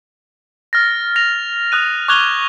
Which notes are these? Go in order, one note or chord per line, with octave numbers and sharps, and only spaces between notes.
F6 A6 A#6
A#6 F7
D#6 F#6 D#7
C#6 D6 F#6 G#6 F7 G7